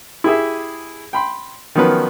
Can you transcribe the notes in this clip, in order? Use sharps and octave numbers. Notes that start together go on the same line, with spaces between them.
E4 G4 G#4 E5
G5 B5 C6
D#3 F3 F#3 B3 C#4 B4